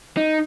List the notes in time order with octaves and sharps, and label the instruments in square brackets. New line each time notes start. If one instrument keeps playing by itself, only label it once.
[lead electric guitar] D#4